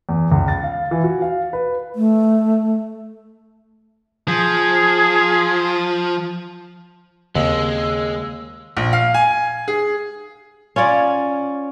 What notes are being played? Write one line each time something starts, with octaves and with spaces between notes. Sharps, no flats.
E2
C#2
A6
F5
E3
F#4
F5
B4
A3
F3 G#4
D#2 C#3 G#3 A#3 C4 E6
A#1
F5
G#5
G#4
C#4 F4 C#5 D5